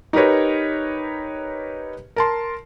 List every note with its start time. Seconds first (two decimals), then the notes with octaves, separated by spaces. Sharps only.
0.13 D#4 G4 A#4 B4 C#5
2.16 A#4 A5 C6